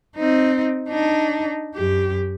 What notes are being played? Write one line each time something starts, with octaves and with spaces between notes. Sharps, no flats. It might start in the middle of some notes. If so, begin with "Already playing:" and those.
C4 D#4
D4 D#4
F#2 G4